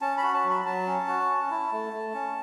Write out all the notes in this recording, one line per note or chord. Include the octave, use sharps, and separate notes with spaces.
C#4 A5
B5
F#4
A5
F#3
B5
F#3 A5
C#4
F#4
C#4
E4
A3
A3
C#4